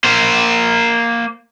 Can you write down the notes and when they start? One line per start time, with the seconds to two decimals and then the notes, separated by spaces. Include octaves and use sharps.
0.04 A#3 C5